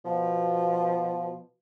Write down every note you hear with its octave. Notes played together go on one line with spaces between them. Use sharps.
B2 F3